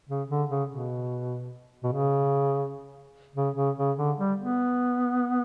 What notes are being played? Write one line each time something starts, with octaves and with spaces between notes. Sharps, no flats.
C#3
D3
C#3
B2
B2
C#3
C#3
C#3
C#3
D3
G3
B3